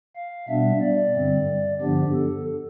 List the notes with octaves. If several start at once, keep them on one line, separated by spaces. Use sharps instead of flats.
F5
B2 G3 B3 D4 E5
D5
G2 D3 G3 C4
G2 D3 F3 B3 D4 G4
A4